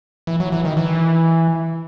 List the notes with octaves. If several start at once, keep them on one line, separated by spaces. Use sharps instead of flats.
E3
F#3
E3
D#3
E3